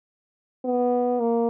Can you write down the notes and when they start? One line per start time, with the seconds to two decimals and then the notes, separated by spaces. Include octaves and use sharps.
0.65 B3
1.20 A#3